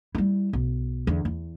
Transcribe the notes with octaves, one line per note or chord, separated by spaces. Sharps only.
G3 E4
B1
E2 D3
E2